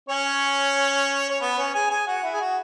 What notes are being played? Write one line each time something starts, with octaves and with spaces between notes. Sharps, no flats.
C#4 C#5
C#5
B3 B4
C#4 C#5
G#4 G#5
G#4 G#5
F#4 F#5
E4
G#4
F#4